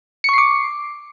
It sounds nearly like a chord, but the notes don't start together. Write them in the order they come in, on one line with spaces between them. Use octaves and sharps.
C#7 C#6 C7 D6